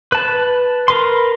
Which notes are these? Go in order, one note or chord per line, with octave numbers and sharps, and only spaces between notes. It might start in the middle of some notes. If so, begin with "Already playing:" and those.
B4 A5
A#4 B4 C6